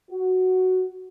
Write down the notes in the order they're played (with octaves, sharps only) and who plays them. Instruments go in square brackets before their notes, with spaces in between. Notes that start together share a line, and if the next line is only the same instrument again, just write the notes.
[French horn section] F#4